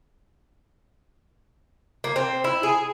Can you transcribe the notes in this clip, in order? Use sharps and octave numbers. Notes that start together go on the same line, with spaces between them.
A#3
C4
E4
G#4